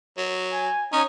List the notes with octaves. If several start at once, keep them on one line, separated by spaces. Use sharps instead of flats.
F#3
G#5
C#4 D#4 C#5